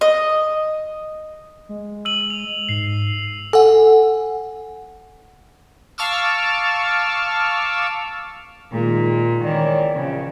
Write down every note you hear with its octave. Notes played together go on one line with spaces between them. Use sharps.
D#5
G#3
E6 D#7 F#7
F7
G#2 C7
A4 F#5 G#5
F5 A5 C#6 D6 E6 F6
A#2 D#3 G#3
C#2 D#3 E3 C#5 D5
A#1 C#3